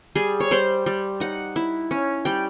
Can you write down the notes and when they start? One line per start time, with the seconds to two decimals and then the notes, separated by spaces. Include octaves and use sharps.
0.15 G3 G#4
0.40 C#5
0.51 G3 C5
0.86 G3
1.20 D#4 F#5
1.56 E4
1.91 C#4
2.25 G3 G5